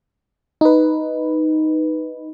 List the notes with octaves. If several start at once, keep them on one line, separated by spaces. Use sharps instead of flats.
D#4 B4